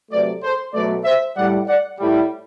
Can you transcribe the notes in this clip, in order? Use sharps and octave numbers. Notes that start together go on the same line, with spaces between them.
C3 F#3 A3 B4 D5
A4 C5
B2 F#3 A3 B4 D5
C5 E5
A2 G3 D5 F#5
D5 F#5
A2 G3